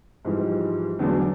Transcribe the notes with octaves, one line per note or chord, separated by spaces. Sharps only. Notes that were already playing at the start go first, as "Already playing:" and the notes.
G#2 E3 F3 G3 G#3
E2 D3 F#3 G#3 B3 D4